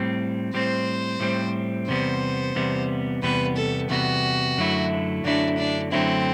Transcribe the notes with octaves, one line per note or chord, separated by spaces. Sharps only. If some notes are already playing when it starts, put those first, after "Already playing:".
Already playing: A2 G3 C4
A2 G3 C4 C5
A2 G3 C4
E2 C3 G3 B3 C5
E2 C3 G3 B3
E2 C3 G3 B3 B4
A4
E2 C3 G3 B3 F#4
F#2 D3 F#3 A3 E4
F#2 D3 F#3 A3 D4 E4
D4
F#2 D3 F#3 A3 C4 E4